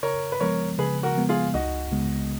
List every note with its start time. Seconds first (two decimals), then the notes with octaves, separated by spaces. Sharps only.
0.03 C#3 A#4 C#5
0.32 B4
0.40 F3 G#3 B3 A#4 C#5
0.79 C#3 G#4 B4
1.03 F#4 A#4
1.16 F3 G#3 B3
1.29 F4 G#4
1.54 C#2 D#4 F#4
1.92 C#3 G#3 B3